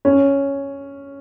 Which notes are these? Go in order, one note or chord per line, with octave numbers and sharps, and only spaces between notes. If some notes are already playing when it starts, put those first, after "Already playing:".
C#4